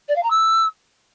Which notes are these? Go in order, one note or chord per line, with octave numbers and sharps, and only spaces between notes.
D5
F5
A#5
E6